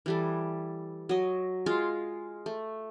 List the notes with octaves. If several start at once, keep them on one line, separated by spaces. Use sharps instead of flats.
E3 G3 A4
F#3 D#5
G#3 F4 F5
A3